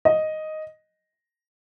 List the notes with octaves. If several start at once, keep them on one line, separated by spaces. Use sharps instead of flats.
D#5